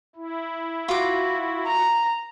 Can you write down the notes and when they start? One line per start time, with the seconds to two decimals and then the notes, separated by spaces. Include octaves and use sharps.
0.16 E4
0.88 F4 F#4 D6
1.67 A#5